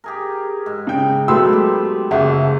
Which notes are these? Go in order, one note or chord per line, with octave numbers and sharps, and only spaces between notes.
G4 G#4 A#4
G#2
C#3 G5
F#3 A3 B3 G5 B5 C6 E6
G4
F#1 F3 A#3 D#4 G#4 E5 F#5